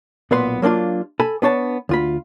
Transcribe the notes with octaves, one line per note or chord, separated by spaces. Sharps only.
B1 A#2 B3 B4 C6
F#3 A#3 C4 D4 F4
A4 G#5 B5
B3 D4 C#5 A5
D2 F4 B5